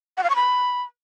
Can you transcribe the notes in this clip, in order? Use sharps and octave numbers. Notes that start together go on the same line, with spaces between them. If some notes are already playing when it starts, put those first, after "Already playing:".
F#5
F5
C#6
B5